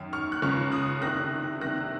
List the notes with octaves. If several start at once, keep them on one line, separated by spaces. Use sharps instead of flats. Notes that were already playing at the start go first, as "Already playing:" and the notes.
Already playing: F#2 D#3
C#6 F6
F#6
C#2 C#3 C#6 F6
D#6 F#6
C2 C3 D#3 F#6 A#6
C2 C3 D#3 F#6 A#6